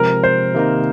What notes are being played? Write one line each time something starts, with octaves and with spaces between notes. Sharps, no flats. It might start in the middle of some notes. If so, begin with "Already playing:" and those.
Already playing: C3 F3 G#3 C4 A#4
C5
C3 D#3 A#3 D#4